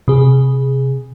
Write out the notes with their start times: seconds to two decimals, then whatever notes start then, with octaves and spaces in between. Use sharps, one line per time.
0.08 C3 G#4